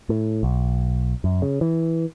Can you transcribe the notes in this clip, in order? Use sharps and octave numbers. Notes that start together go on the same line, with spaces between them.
A2
B1
F#2
C#3
E3